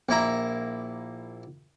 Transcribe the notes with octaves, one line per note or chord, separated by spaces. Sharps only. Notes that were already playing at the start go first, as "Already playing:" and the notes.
A#1 A#3 E4 A#5